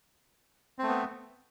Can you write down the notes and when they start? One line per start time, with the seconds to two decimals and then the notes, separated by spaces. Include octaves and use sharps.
0.79 C4
0.83 A3
0.88 B3